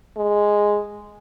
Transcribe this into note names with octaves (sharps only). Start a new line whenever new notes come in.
G#3